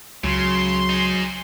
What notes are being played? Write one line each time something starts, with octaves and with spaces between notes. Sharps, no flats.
C#2 C#3 F#3 C6
D#4 G#4